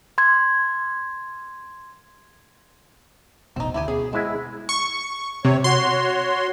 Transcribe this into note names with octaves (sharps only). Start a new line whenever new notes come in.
C6 G#6
E1 A1 B2 C4 D#4
D2 E4 G4 G#5
B2 C#4 G#4
G#3 B3 C4 E4 E5
C#6
C3 C#5
F#4 C#5 C6